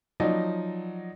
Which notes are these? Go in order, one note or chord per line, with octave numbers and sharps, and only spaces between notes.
F3 F#3 D#4 D5 D#5